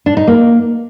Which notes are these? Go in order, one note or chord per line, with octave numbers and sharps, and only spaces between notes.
D4
D#4
A#3